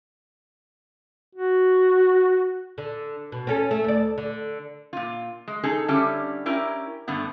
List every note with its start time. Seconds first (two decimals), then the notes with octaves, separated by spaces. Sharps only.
1.36 F#4
2.78 D3
3.32 B2
3.47 C4 C#4 A4
3.71 A3
3.84 D2 D5
4.18 D3
4.93 A#2 F4
5.48 G#3
5.64 D#4 G#4 A4
5.88 D3 G3 C#4 E4 G4
6.46 C#4 E4 G4 A#4
7.08 G2 D3 A3 B3 F#5